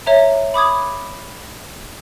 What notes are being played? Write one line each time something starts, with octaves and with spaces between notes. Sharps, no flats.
C#5 E5 A#5
B5 D6 D#6 G#6